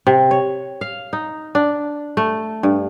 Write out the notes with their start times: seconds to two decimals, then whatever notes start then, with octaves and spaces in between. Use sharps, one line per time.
0.07 C3
0.31 C#5
0.81 F5
1.13 D#4
1.55 D4
2.17 A3
2.63 G2